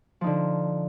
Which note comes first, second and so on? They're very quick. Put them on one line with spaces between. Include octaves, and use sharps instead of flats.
F3 D#4 D3